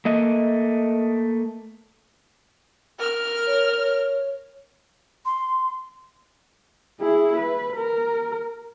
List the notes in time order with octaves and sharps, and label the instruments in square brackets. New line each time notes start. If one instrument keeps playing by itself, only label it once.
[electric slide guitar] A3 A#3 D#5
[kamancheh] A#4 F6
[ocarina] C#5
C#5
C6
[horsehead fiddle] E4 G#4
B4
A#4